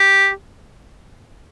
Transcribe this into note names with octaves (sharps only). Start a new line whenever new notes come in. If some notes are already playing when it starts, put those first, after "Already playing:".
Already playing: G4